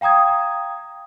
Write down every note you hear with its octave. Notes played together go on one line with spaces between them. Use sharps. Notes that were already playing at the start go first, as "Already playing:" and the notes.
F5 G5 A#5 D#6 G#6